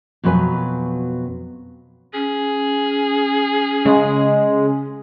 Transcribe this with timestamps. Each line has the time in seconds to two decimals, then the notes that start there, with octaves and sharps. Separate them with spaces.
0.24 F2 B2 F#3 B4 G#5
2.14 C#4 G#4
3.85 C#3 G#3